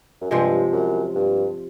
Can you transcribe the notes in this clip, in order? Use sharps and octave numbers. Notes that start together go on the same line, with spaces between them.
F#2
G2 C3 F3 G#3
F#2
G2